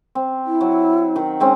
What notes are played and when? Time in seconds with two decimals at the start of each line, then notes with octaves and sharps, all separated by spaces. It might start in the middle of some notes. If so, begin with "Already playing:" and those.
0.15 C4
0.46 E4
0.61 F#3
1.16 D#3
1.40 G#3 C4 C#4